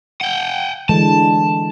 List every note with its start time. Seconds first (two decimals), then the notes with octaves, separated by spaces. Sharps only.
0.21 F#5 G5
0.89 D3 E3 G#3 A5